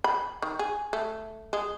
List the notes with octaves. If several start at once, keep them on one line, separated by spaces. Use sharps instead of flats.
B5
D#3
G#4
A3
G#3